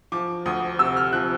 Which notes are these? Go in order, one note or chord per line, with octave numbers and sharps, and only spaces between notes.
F3 D6
D2 D#6
C3 E6
F6
F3 F#6